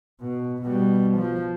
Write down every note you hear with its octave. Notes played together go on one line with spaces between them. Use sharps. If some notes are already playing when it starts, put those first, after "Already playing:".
B2
B2 G3
F3